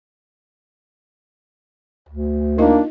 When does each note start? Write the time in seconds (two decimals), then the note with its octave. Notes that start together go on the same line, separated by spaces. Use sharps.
2.09 D2
2.58 A#3 D4 D#4 F4 D#5